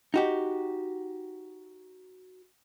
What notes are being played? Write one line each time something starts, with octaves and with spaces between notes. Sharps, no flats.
D#4 F#4 G4